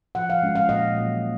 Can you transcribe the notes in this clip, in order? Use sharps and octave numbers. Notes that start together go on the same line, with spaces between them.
F3 F#5
F5
G#3 C#4 F4
F5
A#2 D#5
F#3 A#3